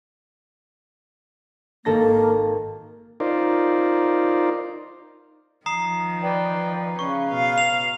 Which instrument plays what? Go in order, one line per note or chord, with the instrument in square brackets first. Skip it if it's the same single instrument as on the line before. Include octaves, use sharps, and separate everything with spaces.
[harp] G#1 A4 A#6 [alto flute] A#3
[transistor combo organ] D#4 F4 A#4 C5 D5
[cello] D#3 F3 [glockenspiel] A#5 D#6 C7
[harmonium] B4 D5 G5
[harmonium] C#3 B4 [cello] C#4 [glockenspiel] C#6
[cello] B2 F5
[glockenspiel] F7